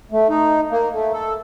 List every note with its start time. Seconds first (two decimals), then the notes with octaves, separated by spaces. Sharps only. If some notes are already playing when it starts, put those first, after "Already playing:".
0.12 A3
0.29 D#4
0.71 A#3
0.92 A3
1.13 A4